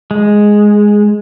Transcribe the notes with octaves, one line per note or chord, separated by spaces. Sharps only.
G#3